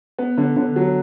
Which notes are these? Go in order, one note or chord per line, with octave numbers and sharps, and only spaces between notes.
B3
D3
D3
F#3